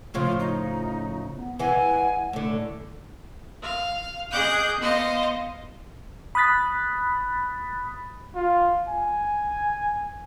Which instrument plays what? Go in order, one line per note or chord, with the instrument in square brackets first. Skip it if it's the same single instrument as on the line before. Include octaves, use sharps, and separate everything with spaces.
[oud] A2 C#3 F3 [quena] F4
[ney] C#4 [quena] D#4
[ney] B3
[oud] E3 G#3 [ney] F#5 [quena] G#5
[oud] A2 D3 [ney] E4
[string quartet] F5
G#4 D#5 F#5 D6 G6
B3 C5 D#5 F5
[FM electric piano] B5 D#6 F#6 A6 B6
[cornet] F4
G#5